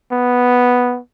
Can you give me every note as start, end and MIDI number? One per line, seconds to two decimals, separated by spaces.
0.12 0.99 59